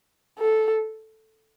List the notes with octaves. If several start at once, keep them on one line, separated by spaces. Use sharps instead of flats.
A4